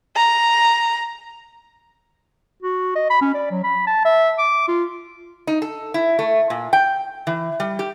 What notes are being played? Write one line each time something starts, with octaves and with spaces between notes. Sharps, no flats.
A#5
F#4
D#5
B5
C#4
D5
F#3
B5
A5
E5
D6
F4
D#4
A4
E4
A3
A#2
G5
E3
G3
G4